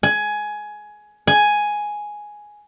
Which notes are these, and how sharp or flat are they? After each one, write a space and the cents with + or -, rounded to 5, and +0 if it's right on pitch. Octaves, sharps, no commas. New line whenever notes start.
G#5 +15
G#5 +5